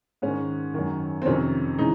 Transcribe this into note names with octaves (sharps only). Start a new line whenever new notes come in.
G#2 D#3 C#4
F#2 D#3
C4
F2 C3 D#3 C#4
C#3 E3 D#4